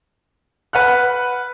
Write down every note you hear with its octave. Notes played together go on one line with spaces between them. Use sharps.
B4 F#5 F6 F#6